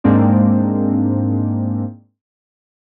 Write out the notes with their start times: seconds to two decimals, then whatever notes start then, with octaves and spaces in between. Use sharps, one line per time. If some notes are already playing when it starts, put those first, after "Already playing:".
0.04 G#2 G#3 A#3 C4 D4